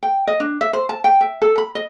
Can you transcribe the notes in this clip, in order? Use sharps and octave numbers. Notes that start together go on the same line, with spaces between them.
G5
D#5
D4
E5
C5
A5
G5
E5
A4
B5
D#5